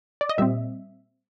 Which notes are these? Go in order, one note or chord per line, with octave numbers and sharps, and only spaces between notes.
D5
D#5
A#2 G3 C4 E5